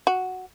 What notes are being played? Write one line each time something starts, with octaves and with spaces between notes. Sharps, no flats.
F#4